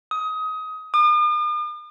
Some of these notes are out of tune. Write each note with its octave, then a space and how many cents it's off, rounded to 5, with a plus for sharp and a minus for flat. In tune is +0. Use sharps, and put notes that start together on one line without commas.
D#6 +20
D#6 -45